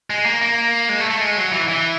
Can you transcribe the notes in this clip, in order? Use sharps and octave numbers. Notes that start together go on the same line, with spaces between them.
G#3
A#3
A#3
G#3
A3
A3
G#3
F#3
E3
E3